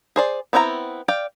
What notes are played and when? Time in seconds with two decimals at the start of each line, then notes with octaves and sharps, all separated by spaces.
0.16 G#4 C5 D5
0.53 B3 C4 E4 F#5 A#5
1.08 D5 F5 G5